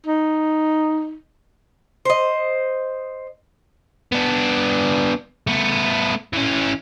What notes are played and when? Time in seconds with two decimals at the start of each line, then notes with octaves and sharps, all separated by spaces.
0.06 D#4
2.05 C5 D#5
4.12 B3 D4
5.47 A3 B3
6.33 E3 C#4